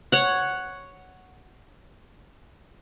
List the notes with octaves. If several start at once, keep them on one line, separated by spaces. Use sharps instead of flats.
C#5 F#5